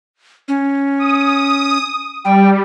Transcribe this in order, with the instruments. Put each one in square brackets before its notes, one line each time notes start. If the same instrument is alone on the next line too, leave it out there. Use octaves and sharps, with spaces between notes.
[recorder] C#4
[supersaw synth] D#6
[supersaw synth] G3 [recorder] G5